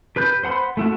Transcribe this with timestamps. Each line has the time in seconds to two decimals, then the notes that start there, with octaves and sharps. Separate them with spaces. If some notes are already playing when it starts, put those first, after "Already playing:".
0.16 G4 B4 B5 G6
0.44 C5 F#5 B5 C6
0.77 A3 E4 F#4